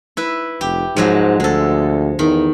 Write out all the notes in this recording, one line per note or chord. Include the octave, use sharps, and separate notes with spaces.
E4 B4
F1 G4
G#2 F3 F#3 G#3
D2 G#3 A4
E2 D#3